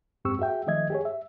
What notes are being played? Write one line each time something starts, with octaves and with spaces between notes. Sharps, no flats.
F2 G#2 C4 G4 C#6 E6
F#4 G#4 E5 G5
D#3 F3 A3 D#5 E5 G#6
G4 G#4 C#5
E5